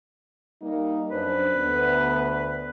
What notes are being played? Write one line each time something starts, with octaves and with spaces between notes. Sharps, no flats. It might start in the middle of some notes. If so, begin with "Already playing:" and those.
G3 A#3 D#4
F#2 D4 B4 C5
D2 B3